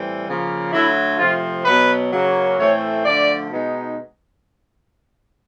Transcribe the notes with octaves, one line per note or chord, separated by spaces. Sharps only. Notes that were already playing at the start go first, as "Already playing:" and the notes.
Already playing: A2 E3 G3 C4
C#3 F3 A#3
D3 F#3 A3 E4
C3 F3 A3 F4
B2 F#3 B3 B4
C#3 F#3 A#3
A2 E3 A3 C4 C#5
D3 F3 A3 D5
B2 G#3 B3 D#4